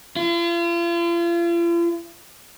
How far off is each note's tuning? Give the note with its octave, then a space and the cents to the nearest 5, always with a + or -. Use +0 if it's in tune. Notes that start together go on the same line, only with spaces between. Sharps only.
F4 -40